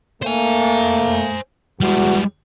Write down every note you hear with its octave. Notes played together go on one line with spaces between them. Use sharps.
A3 A#3 C5 G#5
E2 G3 G#3 F#4